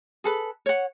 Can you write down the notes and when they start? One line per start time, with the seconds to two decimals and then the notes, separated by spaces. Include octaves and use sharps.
0.24 G#4 A4 B4
0.66 C#5 F#5